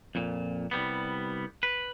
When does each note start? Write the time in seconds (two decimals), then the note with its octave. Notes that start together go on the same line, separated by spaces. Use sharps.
0.15 F2 A#2
0.71 C2 G3 B3
1.63 B4